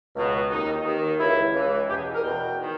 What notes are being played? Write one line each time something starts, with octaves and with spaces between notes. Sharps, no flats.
C#2 B2
D#2 D#3 D#4
D#2 D#3
C#2 C#3 E3 E4
C#2 C#3 E3
E2 B2 G4
G#4
A#4
E2 B2 G5
D#3